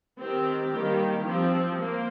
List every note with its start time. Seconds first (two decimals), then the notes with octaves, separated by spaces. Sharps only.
0.19 D#3 C4 G4
0.73 D#3 G3 A#3
1.25 F3 C4
1.79 A#3 C5